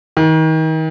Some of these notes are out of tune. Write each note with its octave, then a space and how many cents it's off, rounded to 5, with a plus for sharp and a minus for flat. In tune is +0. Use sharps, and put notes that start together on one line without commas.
D#3 +35